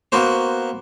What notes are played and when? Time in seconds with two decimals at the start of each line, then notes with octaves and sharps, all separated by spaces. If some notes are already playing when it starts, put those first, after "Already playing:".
0.12 A#3 B3 F#4 C5